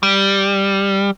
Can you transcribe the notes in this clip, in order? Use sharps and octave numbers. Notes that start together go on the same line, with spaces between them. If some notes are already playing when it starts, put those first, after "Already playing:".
G3